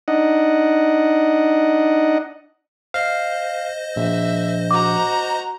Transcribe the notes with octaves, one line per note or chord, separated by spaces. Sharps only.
D4 D#4 D#5 F#5
C5 D#5 F5
A#1 E5
F#4 A#5 D6